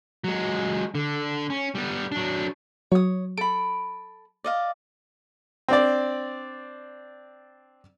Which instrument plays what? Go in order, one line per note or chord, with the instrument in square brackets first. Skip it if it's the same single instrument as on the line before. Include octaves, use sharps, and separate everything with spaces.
[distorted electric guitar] F#3 G#3
D3
C#4
G3 B3
F#3 D4
[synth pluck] F#3 [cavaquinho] C#5 D#6
[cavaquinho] A4 B5 [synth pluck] D7
[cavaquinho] D5 D#5 F5
[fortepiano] C4 D4 D5